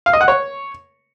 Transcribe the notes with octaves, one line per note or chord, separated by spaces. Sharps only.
F5
D#5
F#5
C#5